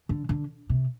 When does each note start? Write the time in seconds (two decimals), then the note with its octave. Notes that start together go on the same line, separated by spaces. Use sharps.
0.09 D3
0.29 D3
0.69 C3